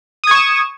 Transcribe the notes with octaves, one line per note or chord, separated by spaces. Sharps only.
C#6 D#6 G#6 E7